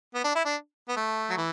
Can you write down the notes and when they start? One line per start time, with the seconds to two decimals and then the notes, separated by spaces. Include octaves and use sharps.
0.15 B3
0.25 D4
0.35 E4
0.45 D4
0.89 B3
0.97 A3
1.30 F#3
1.37 E3